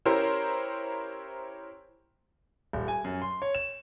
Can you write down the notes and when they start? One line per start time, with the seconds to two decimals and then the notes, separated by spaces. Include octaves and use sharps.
0.05 C#4 E4 G4 A#4 C5
2.73 D#1
2.88 G#5
3.04 F#2
3.22 C6
3.42 C#5
3.55 E7